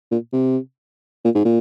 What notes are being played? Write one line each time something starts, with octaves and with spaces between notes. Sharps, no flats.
A#2
C3
A#2
G#2
A#2